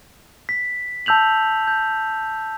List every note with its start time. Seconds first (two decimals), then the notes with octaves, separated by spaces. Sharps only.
0.49 B6
1.06 A5 E6 G6 F7 F#7
1.67 G6